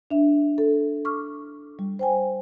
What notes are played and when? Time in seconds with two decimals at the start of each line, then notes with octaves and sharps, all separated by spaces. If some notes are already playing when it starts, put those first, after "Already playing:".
0.11 D4 E5
0.58 A4
1.05 C#6 D6 F6
1.79 G3
1.99 C5 G5 G#5